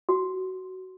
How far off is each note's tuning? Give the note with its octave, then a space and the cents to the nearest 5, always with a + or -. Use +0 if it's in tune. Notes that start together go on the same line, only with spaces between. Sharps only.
F#4 +15